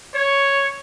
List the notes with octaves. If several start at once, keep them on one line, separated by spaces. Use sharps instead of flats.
C#5